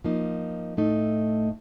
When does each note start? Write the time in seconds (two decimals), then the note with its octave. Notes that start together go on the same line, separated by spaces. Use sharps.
0.04 F3 A#3 D#4
0.77 A2 A3 D#4